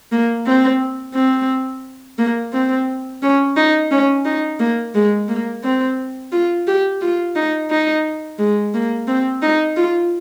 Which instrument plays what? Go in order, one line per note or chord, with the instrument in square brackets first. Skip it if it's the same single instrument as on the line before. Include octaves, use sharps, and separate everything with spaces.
[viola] A#3
C4
C4
A#3
C4
C#4
D#4
C#4
D#4
A#3
G#3
A#3
C4
F4
G4
F4
D#4
D#4
G#3
A#3
C4
D#4
F4